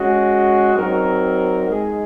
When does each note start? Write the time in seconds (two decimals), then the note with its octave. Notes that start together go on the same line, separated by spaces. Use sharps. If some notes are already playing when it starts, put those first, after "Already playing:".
Already playing: G#3 C#4 F#4
0.75 F#3 C4 D#4 A#4
1.66 G#3 D#4 G#4